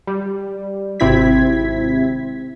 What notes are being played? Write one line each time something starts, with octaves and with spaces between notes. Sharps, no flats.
G3
G#1 C3 C4 E4 G#6 B6